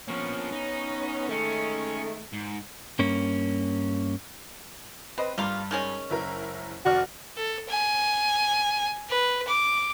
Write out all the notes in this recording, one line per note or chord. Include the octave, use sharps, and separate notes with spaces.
F3 A#3 B3 C#4
D#4
D#3 G#3 A3 C#4
G#2
G2 A#3 C#4
C4 B4 D#5
G2 G3 A#3 F4
D#3 G#3 C#4
F#1 E4 A#4
F1 F#4 D5 F6
A4
G#5
B4
D6